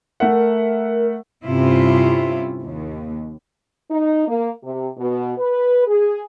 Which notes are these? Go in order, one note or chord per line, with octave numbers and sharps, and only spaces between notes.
A3 A#4 E5 F#5
G2 C3 C#4 E4 F4
D#2
D#4
A#3
C3
B2
B4
G#4